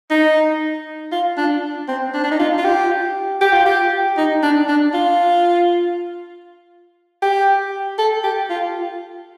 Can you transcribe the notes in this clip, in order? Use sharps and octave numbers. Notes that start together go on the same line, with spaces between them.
D#4
F4
D4
C4
D4
D4
D#4
F4
F4
G4
G4
F4
G4
D#4
D4
D4
F4
G4
A4
G4
F4